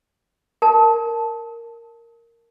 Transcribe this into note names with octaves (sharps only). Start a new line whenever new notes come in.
A#4 A5